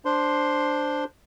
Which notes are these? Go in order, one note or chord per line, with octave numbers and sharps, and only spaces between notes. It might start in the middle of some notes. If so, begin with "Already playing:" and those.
D4 C5 C6